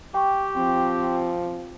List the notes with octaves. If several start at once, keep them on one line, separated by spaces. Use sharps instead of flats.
G4 G5 C#6
F3 C4